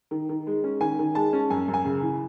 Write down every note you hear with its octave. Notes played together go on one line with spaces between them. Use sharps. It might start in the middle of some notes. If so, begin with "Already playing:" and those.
D#3
D#3
G#3
C#4
D#3 G#5
D#3
G#3 A5
C#4
F#2 G#5
F#2
G#5
C#3
E3